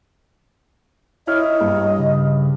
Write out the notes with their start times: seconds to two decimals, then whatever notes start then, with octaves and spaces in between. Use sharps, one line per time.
1.27 E4 C#5 D#5 F6
1.61 G2
1.99 C#3